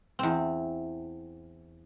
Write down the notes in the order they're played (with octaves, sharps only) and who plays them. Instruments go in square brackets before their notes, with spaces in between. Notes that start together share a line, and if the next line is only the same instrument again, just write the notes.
[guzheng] E2 C4